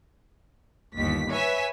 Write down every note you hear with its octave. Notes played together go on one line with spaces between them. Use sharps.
G1 D#2 B6
B4 C#5 E5 G#5 B6